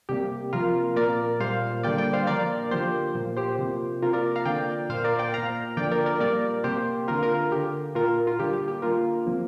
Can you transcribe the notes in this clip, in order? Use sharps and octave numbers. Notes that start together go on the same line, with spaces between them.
C3 G3 A#3 G4
C3 F3 A#3 F4 A#4
A#2 A#3 A#4 D5
A#2 G3 A#3 C5 F5
D3 G3 A#3 D5 G5
D5 G5
C5 F5
A#2 F3 A#3 A#4 D5
D3 F3 A#3 G4 C5
A#2 F3 A#3
G4 C5
C3 F3 A#3
C3 F3 A#3 F4 A#4
A#4 D5
F5 A#5
D3 F3 A#3 D5 G5
A#2 A#3 C5 F5
A#4 D5
D5 G5
A#2 A#3 F5 A#5
D3 F3 A#3 D5 G5
A#4 D5
A#4 D5
A#2 G3 A#3 A#4 D5
C3 A#3 G4 C5
D3 A#3 F4 A#4
F4 A#4
D3 A#3 G4
A#2 A#3 F4 A#4
F4
D3 G3 A#3 G4
G4
G4
D3 A#3 F4 A#4
C3 F3 A#3